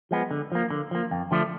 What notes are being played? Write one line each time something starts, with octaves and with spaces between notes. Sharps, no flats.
F3 G#3 B3
D3
F3 A#3
D3
F3 A#3
F2
D3 F3 A3 D4